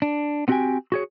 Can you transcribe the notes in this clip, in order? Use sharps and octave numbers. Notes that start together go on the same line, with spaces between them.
D4
B3 C4 F#4 G4 G5 G#5
F#4 G#4 C#5